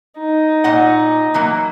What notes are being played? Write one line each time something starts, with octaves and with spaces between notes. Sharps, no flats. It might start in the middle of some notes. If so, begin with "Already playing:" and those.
D#4
A#2 D#5 F#5
E3 F#3 A#3